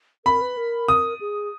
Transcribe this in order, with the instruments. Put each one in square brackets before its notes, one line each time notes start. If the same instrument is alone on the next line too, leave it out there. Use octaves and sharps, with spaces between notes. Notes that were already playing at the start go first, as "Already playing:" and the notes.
[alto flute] A#4 [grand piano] B5
[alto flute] B4
A#4
[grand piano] D#6
[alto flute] G#4